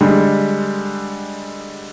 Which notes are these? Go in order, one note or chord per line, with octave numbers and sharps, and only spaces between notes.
D3 G3 G#3